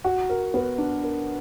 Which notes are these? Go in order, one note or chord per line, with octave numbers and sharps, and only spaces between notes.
F#4
A#4
B3
D4
A#4